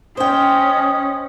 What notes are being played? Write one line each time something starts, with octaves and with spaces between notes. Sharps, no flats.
C#4 C5 D#5 G5 D#6